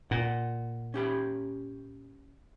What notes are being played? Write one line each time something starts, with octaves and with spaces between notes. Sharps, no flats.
A#2 F#5
C#4 G4 B5